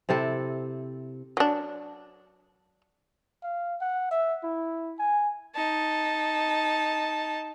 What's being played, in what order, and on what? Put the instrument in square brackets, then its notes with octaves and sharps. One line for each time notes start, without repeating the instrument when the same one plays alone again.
[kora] C3 C4 E4 A4
[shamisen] F#3 D4
[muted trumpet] F5
F#5
E5
E4
G#5
[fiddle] D#4 A5